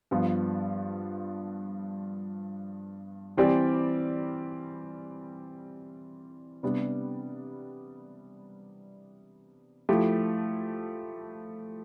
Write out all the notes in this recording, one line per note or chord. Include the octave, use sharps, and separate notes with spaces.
G2 F3 B3 F4
E3 G3 C4 G4 D5
C3 G3 B3 D4
F3 A3 E4 G4